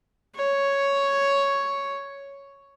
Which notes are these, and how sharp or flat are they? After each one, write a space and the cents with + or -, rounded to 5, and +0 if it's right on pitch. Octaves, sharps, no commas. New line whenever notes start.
C#5 +5